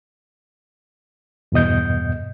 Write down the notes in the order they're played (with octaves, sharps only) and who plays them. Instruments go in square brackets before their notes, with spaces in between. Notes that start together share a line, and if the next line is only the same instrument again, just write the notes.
[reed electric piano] E2 G2 B2 D#5 G6